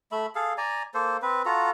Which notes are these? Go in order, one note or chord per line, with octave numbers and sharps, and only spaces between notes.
A3 E5 B5
G#4 A4 F5
D5 G#5 A#5
A#3 A4 C5
C4 B4
F4 F#4 A4 A#5